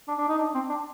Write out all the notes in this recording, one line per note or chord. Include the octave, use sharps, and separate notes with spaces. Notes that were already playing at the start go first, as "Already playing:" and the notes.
D4
D4
D#4
D4
C4
D4